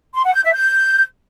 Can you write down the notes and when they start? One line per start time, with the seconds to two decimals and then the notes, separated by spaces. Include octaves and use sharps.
0.14 C6
0.24 F#5
0.34 G6
0.44 E5
0.53 G6